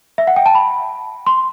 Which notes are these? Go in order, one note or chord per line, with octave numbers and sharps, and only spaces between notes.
E5
F#5
G5
A5
B5
C6